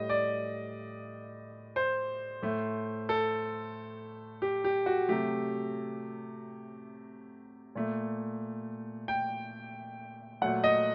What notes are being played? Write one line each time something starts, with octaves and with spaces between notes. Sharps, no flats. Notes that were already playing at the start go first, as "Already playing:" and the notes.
Already playing: A2 G3 D#5
D5
C5
A2 A3
A4
G4
G4
F#4
C3 F#3 A3 G4
A#2 A3
G5
A#2 F#3 A3 F#5
D#5